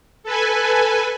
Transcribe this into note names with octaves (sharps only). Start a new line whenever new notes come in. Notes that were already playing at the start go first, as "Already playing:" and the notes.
A4 B4 G#5